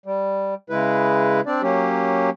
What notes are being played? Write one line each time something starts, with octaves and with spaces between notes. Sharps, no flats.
G3
C#3 G#3 E4 B4
C4 D4 D5
F#3 A#3 C#4 G4